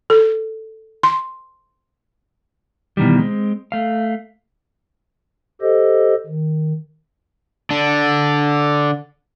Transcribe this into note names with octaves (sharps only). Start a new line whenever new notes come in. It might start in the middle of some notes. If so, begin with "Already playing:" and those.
A4
C6
B2 D#3 E3 G3
G#3 C4
A3 F5
G4 A4 C5 D#5
D#3
D3 D4